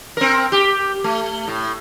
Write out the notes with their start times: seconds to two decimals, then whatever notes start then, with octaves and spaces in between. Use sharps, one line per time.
0.17 C4 A#4
0.52 G4
1.04 A3
1.48 A2